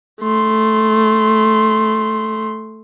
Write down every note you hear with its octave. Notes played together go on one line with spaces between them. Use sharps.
A3 C6